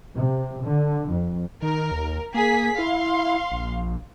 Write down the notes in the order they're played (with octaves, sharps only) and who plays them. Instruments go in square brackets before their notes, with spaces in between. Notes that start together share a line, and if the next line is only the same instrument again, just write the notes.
[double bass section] C3
D3
F2
[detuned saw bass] D#3 [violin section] A#4
[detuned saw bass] D#2
[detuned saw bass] A#3 [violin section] G#4 B6
[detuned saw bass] E4 [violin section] F5 C6
[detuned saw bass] A#1